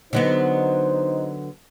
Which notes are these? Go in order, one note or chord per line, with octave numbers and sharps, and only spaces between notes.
D3 F#3 B3 D#4 C5